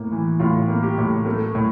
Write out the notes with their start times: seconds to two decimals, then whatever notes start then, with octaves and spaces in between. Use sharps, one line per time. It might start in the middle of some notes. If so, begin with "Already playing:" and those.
Already playing: A2 A#3
0.12 E3
0.39 A2 F4
0.68 A#3
0.83 G4
0.98 A2
1.26 A3 A#4
1.55 A2